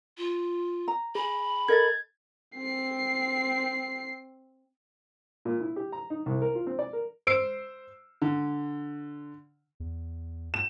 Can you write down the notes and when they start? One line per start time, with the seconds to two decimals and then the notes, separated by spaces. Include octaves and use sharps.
0.18 F4
0.88 A#5
1.15 G#4 B5
1.68 A4 A#4 D#5 G#6 A6
2.57 C4 C7
5.45 A#2
5.60 E4
5.76 G4
5.92 A#5
6.10 D#4
6.26 C2
6.42 A#4
6.55 F4
6.67 C4
6.79 D5
6.93 A#4
7.27 C5 E6 C7 D7
8.22 D3
9.80 E2
10.54 E7